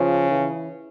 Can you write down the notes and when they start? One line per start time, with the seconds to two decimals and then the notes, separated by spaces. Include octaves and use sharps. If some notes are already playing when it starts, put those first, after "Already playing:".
Already playing: C#3 F3
0.31 E3